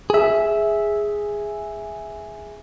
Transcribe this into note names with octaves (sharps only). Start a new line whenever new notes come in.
G#4 E5